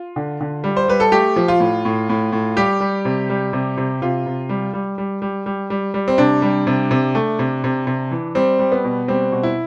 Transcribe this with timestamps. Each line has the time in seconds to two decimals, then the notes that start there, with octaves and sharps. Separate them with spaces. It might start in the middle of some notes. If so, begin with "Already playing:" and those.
Already playing: F4
0.16 D3
0.41 D3
0.64 G3
0.77 C5
0.88 G3 B4
1.00 A4
1.12 A3 G4
1.36 F3
1.48 F4
1.60 A2
1.85 A2
2.09 A2
2.32 A2
2.56 G3 G4
2.80 G3
3.05 C3
3.30 G3
3.53 C3
3.77 C3
4.02 C3 F4
4.26 C3
4.49 G3
4.73 G3
4.98 G3
5.22 G3
5.46 G3
5.70 G3
5.94 G3
6.08 C4
6.18 C3 D4
6.42 G3
6.67 C3
6.91 C3
7.15 A3
7.39 C3
7.64 C3
7.87 C3
8.11 E3
8.35 G3 C4
8.59 G3
8.72 B3
8.84 B2
9.08 G3 C4
9.32 B2
9.43 E4